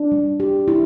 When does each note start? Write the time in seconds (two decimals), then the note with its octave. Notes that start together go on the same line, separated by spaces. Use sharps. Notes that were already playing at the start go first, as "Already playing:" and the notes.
Already playing: D4
0.12 G3
0.40 G4
0.68 E4